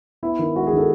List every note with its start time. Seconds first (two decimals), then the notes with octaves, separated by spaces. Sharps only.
0.23 B3 E4
0.39 D#3
0.56 G#3 F#4
0.67 G#4
0.73 D#3 A4